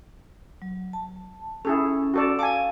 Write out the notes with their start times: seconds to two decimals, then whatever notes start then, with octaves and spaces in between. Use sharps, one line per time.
0.62 F#3
0.93 A5
1.65 C#4 E4 G#4 A4
2.14 F#4 A4 D5
2.39 F5 G#5 A5 D6